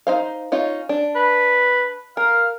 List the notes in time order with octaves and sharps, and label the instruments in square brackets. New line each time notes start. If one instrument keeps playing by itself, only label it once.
[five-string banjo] D#4 C5 F5
C#4 D#4 F4
D4
[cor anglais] B4
[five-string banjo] A#4 [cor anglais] F5